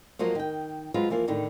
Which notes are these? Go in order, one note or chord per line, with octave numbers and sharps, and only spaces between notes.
F3 F#3 A#3 C5 D#5
D#3 G5
F#3 G#3 F4 B4 C5
E3 F3 A#3 F4
A2 D3 D#3